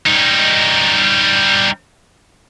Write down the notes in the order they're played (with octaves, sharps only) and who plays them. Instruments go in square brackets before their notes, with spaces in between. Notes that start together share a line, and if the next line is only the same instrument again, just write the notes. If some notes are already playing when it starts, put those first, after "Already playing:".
[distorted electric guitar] G3 D#4